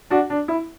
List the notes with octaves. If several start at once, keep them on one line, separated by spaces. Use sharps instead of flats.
D4 F#4
D4
E4